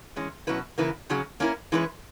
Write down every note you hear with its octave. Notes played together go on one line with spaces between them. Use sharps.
E3 G#3 C#4
B2 F#3 C#4 E4 B4
C#3 E3 A#3 E4 B4
C#3 F#3 C#4 G#4
A#3 C#4 E4 A#4
E3 G#3 C#4 E4 B4